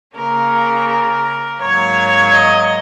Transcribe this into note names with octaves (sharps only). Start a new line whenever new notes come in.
C#3 A#3 C#4 A#4
A#4
G#2 F#3 A#3 C#5
D#5